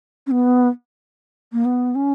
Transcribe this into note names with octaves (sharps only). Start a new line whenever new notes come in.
C#4
B3
A#3
B3
C#4